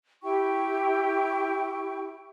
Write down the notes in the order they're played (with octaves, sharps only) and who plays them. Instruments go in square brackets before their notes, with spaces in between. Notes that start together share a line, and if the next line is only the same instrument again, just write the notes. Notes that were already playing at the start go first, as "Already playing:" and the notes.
[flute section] E4 G4 G5 C#6